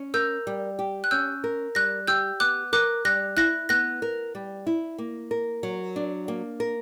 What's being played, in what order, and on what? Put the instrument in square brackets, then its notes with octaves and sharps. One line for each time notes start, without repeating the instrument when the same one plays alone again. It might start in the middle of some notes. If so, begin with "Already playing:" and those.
Already playing: [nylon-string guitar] C#4
[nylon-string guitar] A#4 [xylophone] E6 G6
[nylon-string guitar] G3
G4
[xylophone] F#6
[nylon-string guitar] C#4 [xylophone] E6 G6
[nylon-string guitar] A#4
[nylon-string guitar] G3 [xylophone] F#6 A#6
[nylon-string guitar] G4 [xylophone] E6 G6
[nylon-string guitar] B3 [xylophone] D6 F#6
[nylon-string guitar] A#4 [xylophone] D6 F#6
[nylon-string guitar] G3 [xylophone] F#6 A#6
[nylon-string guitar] E4 [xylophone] F#6 A#6
[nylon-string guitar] B3 [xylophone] F#6 A#6
[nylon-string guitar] A#4
G3
E4
A#3
A#4
F#3
D4
A#3
A#4